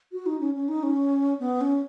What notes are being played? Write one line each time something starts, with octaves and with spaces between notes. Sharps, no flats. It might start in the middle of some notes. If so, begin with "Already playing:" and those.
F#4
D#4
C#4
C#4
D#4
C#4
B3
C#4